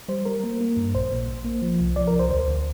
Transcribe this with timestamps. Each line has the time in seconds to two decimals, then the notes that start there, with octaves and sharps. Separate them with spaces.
0.09 G3 C5
0.25 G3 A#4
0.44 A#3
0.61 A#3
0.77 G2
0.95 A#1 C5
1.12 A#2
1.28 A#1
1.45 A#3
1.62 F3
1.80 C2
1.96 F3 D5
2.08 A#4
2.13 C2
2.19 C5
2.30 D2 C5
2.48 D2